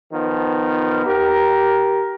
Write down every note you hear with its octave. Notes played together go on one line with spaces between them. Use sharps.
D#3 F3 B3
G4 A#4